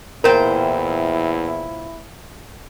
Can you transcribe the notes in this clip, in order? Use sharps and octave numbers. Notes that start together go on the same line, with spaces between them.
E2 A#2 E4 A#4 C5 G5